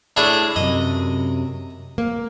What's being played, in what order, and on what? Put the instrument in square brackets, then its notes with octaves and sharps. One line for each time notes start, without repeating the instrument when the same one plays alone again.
[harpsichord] A2 D4 G#4
[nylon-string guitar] F#2 C3 [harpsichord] D#5
[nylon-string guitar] A#3